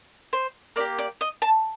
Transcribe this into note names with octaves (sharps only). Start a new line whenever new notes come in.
C5
A#3 D4 G4 D5
D5
D#5
A5